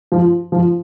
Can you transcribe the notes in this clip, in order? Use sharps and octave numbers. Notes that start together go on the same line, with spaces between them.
F3
F3